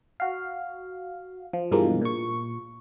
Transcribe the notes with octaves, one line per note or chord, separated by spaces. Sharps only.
F#4 F5
F3
G2 B2 E3 F3 G#3 A#3
A#2 C#6